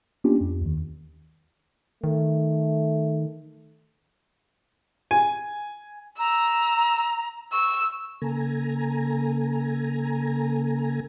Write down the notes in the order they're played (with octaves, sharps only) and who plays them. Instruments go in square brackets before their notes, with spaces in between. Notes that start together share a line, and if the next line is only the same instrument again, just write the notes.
[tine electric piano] A#3 B3 C#4 D4 F4 G4
F2
D#2 D#3
[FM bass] D#3 [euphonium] A3
[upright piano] G#5
[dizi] A#5 [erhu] E6
[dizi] C#6 [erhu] E6
[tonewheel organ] C#3 A#3 A4 G#5 A#5